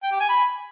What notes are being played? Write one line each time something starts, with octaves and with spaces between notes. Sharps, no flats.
G5
G4
G#5
B5